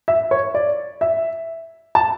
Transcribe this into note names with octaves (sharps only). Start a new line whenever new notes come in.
E5
C#5
D5
E5
A5